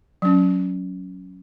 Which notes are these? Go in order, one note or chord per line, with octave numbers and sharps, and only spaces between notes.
F#3 C#4